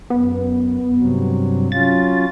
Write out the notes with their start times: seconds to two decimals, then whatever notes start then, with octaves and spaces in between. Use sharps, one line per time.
0.10 F#2 B3
0.96 G2 C3 F#3
1.72 F#3 C#4 F4 A6